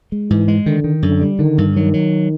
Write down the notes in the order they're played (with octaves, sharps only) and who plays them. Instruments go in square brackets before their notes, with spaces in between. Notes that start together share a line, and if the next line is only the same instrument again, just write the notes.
[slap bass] G#3
[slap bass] G#2 [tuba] E3
[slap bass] G#3
[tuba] D3 [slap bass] D#3
[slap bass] D#3
[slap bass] F#2 [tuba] D3
[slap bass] G3
[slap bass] D3 [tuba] D#3
[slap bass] G2
[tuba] D#3 [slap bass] F#3
[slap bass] F#3